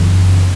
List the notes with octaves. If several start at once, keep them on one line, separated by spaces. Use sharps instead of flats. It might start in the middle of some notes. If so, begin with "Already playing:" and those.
Already playing: F#1 F#2 E3 B3